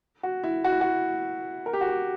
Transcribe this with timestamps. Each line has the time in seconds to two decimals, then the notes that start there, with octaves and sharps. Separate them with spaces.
0.23 F#4
0.44 E4
0.64 F#4
0.72 E4
0.81 F#4
1.66 A#4
1.73 G4
1.81 F#4
1.88 G4